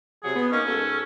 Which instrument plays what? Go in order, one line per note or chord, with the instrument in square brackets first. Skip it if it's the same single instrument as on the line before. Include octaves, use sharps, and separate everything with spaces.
[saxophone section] C3 F#3 [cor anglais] G#4
[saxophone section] B2 B3
[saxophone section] A#3 D#4 [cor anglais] C#4
[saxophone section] G#2 F#4 A4